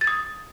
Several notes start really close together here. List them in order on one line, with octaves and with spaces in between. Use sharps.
A6 G#6 D#6